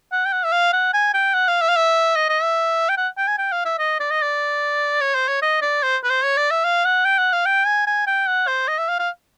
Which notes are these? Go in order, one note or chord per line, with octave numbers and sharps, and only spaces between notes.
F#5
G5
F#5
E5
F5
F#5
G#5
G5
F#5
F5
E5
F5
E5
D#5
D#5
E5
G5
F#5
G5
G#5
G5
F5
E5
D#5
D5
D#5
D5
C#5
C5
C#5
D#5
D5
C5
B4
C5
C#5
D5
E5
F5
F#5
G5
F#5
F5
G5
G#5
G#5
G5
F#5
C5
D#5
E5
F5
F5